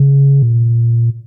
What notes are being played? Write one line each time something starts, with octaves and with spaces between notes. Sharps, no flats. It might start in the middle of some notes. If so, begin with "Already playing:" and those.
Already playing: C#3
A#2